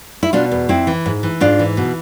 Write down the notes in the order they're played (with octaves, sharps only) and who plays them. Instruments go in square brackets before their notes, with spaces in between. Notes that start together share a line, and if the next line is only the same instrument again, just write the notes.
[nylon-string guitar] E4
B2 D4 F4
E2
F2 C4 E4
E3
G#2
E3
G#2 D4 F4
E3
B2